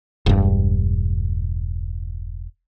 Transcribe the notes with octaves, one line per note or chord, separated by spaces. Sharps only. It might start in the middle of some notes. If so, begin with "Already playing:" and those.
E1 G2